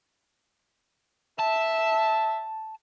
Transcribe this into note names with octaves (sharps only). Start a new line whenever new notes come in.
E5 A5